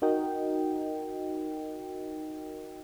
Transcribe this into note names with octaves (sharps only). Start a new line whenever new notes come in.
D#4 F#4 A#4 D#5 G5